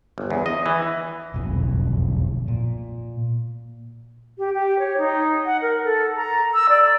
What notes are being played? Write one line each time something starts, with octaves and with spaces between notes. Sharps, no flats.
G1
E2
D#5
E3
E1 B1 F2
A#2
G4
G4
C#5
D#4
F#5
A#4
A4
A#5
E6
D5